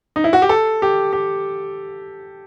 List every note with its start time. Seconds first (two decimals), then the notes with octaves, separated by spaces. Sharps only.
0.16 D#4
0.24 E4
0.33 F#4
0.42 G4
0.49 A4
0.82 G4
1.13 G4